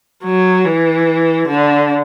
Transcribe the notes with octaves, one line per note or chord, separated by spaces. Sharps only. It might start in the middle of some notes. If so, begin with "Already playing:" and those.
F#3
E3
D3